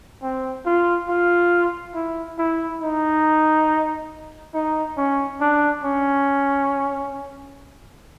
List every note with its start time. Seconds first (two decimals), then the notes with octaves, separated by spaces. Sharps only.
0.22 C4
0.65 F4
1.09 F4
1.95 E4
2.38 E4
2.82 D#4
4.54 D#4
4.97 C#4
5.41 D4
5.84 C#4